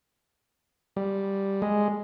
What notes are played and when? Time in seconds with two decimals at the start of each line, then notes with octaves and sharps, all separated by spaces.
0.97 G3
1.62 G#3